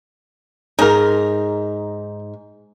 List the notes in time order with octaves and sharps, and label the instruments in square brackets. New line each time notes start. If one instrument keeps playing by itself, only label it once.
[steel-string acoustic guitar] G#2 [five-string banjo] D#4 A#4